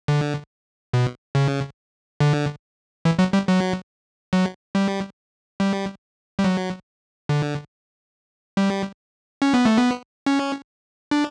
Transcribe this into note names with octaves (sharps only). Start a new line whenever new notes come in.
D3
B2
C#3
D3
E3
F#3
G3
F#3
F#3
G3
G3
G3
F#3
D3
G3
C#4
B3
A3
B3
C#4
D4